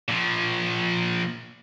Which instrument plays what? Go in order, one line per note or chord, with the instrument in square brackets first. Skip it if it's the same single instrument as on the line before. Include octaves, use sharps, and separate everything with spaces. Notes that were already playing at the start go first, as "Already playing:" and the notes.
[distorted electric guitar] A#2 F3